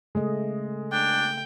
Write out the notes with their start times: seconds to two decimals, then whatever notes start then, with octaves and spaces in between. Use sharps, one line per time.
0.15 C#3 G#3 A3 D#5
0.92 D4 G5